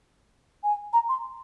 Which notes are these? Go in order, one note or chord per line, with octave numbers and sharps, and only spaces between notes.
G#5
A#5
C6